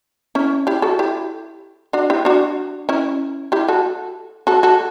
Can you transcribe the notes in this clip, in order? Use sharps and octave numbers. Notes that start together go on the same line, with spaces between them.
C#4 E4
E4 G4
F#4 A4
E4 G4
D4 F#4
E4 G4
D4 F#4
C#4 E4
E4 G4
F#4 A4
F#4 A4
F#4 A4